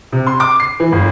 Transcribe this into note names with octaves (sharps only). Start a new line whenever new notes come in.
C3
C6
D6
C7
E3
G1